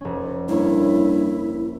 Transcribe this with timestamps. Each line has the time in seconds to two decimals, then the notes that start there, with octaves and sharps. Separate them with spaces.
0.01 F1 C#4
0.49 G2 A#3 E4 C#5